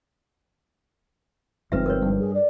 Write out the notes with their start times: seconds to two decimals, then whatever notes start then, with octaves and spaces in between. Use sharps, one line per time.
1.72 G1 G#2 F3 C4 B4 E5
1.86 A#4 B4 C#5
2.02 G2
2.19 G#4
2.34 D5